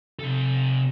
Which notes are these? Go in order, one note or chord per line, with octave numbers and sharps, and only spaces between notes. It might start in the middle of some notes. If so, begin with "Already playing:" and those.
C3 A4